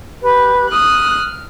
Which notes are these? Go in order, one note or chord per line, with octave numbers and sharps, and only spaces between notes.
G4 B4
D#6 F6 F#6